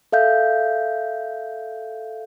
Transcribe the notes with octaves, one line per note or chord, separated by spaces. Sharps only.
A4 E5 F5 G6